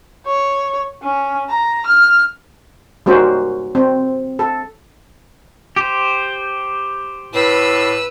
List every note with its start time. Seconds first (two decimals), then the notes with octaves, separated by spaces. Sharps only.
0.26 C#5
1.03 C#4
1.49 A#5
1.86 F6
3.06 G3 A#3 C#4 D#4 F#4 C5
3.75 C4
4.39 A4
5.76 G4 C5
7.34 A2 B4 E6